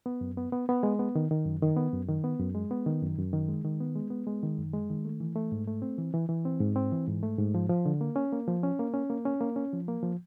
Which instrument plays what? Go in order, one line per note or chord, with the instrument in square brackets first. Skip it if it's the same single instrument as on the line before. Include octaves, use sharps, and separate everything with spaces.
[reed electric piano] B3
F#2
B3
B3
B3
G#3
B3
D#3
D#3
F#2
D#3
B3
F#2
D#3
B3
F#2
G#3
B3
D#3
F#2
F#2
D#3
G#3
D#3
B3
G#3
B3
G#3
D#3
F#2
G#3
D#3
A3
E3
A3
G#2
A3
C4
E3
E3
E3
C4
G#2
C4
E3
G#2
A3
G#2
F3
F3
D3
A#3
C#4
A#3
F3
C#4
A#3
C#4
A#3
C#4
A#3
C#4
F3
A#3
F3